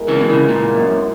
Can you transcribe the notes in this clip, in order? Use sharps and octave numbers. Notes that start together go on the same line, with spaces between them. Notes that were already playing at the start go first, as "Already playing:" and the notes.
Already playing: G#3 B3 E4 A#4
C#3 E3
B2
C#3
A#2
F#2